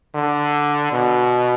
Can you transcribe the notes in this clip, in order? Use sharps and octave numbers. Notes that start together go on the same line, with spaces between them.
D3
B2